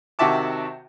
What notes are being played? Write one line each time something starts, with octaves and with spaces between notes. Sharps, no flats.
C3 D#3 F#4 E5 A5 D6